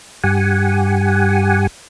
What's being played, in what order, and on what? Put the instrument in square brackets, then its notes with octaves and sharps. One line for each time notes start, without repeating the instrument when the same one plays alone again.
[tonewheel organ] G2 G4 F#5 G#5